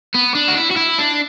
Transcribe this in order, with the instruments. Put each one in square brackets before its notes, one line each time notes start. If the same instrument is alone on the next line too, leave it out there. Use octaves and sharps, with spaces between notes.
[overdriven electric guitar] B3
D4
F#4
E4
F#4
E4
D4